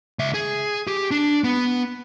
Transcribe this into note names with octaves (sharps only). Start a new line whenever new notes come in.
C#2 E5
G#4
G4
D4
B3